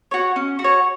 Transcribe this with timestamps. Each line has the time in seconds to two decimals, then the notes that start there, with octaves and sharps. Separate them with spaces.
0.11 F#4 C#5
0.36 C#4
0.59 F#4
0.64 C#5